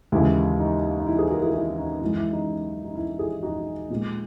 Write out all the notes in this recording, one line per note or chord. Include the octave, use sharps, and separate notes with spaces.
D#2 C#3 E3 G#3 E4
D#4
D#4
E4
G#4 B4
F#4 A#4
E4 G#4
E4
D#4
F#2 E3 G#3 E4
E4
D#4
D#4
E4
E4 G#4
D#4 F#4
A#2 G#3